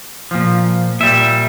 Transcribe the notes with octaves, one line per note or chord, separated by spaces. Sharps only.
A#2 F3
A#2 G3 E5